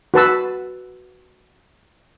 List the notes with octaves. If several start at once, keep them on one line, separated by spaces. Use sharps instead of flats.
F#4 B4 A5 E6